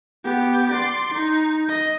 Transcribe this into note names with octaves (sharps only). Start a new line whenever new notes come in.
B3 G4
D5 C6
D#4
D#5